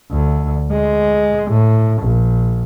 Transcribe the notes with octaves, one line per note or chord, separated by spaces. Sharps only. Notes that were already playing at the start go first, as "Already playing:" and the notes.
D2
G#3
A2
A#1